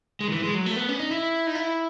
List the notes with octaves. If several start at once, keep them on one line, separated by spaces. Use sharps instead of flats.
G#3
D#3
E3
G#3
F#3
A3
B3
C#4
D#4
E4
D#4
E4